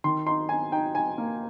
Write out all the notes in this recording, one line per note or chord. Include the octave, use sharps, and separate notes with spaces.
D#3 C6
D#4 C6
D#4 G#5
D#4 G5
D#4 G#5
A#3